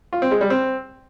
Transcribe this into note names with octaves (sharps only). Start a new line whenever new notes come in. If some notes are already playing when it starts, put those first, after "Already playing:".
F4
C4
G#3
G3
C4